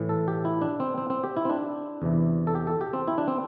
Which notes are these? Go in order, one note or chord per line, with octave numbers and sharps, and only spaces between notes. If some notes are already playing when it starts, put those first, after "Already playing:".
Already playing: A2 E3
A4
G4
E4
D4
C4
C4
C4
G4
E4
C4
D4
E2 C3 E3
A4
G4
A4
G4
C4
E4
D4
C4